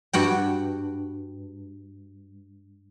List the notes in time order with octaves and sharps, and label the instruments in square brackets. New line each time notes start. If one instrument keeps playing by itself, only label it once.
[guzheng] G2 F#4 F#5 G5